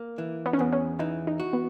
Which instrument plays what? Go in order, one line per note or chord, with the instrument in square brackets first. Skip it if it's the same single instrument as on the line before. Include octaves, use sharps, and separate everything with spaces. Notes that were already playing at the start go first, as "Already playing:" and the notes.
Already playing: [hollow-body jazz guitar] A#3
E3
[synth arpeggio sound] B3
C#4
[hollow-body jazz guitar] E2 [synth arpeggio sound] B3
[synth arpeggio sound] C#4
[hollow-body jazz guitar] E3 [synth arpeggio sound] D#4
[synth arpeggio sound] D#4
[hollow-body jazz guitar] F#4
[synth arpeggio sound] B3